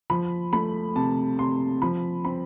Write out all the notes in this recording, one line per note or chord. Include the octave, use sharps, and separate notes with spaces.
F3 B5
A3 B5
C3 A5
C3 C6
F3 B5
C4 B5